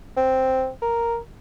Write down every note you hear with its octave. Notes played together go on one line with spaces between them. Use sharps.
C4
A#4